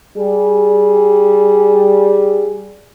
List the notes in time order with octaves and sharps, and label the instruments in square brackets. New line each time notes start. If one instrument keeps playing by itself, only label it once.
[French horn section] G3 G#4